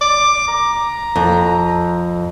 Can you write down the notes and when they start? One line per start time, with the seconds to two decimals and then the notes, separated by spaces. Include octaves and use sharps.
0.02 D6
0.48 A#5
1.16 F2